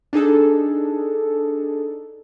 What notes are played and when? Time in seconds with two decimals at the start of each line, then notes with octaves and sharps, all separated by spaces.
0.13 D4 D#4 G#4 A4